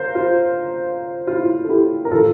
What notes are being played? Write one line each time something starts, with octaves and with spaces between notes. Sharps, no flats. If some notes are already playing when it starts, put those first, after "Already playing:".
Already playing: A#4 C5 F5
F4
F4
E4
F4
A4
E4 G4
A#4
A2 F3 F4 A4